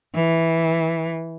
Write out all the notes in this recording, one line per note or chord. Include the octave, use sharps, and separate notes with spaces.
E3